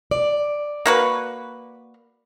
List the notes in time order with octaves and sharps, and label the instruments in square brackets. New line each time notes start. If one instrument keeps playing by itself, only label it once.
[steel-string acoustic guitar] D5
[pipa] A#3 F#4 B4